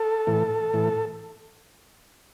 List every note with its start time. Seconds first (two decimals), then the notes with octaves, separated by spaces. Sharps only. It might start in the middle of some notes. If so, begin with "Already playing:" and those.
Already playing: A4
0.27 A2 E3
0.73 A2 E3